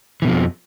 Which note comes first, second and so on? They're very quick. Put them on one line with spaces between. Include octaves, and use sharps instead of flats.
E3 B2 F3 F2